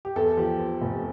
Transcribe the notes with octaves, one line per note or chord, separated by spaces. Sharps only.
G4
E2 A4
F3 G4
F3
F1